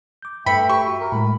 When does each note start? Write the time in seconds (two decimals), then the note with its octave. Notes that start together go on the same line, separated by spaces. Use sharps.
0.22 D6 G6
0.46 G2 A3 B4 E5 G5 B5 C#7
0.69 G4 C#6
0.87 F#4
1.00 A#4
1.12 A2 G#3 B5